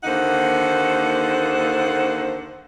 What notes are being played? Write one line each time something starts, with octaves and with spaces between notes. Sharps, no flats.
D#2 D3 A#3 D#4 C5 F#5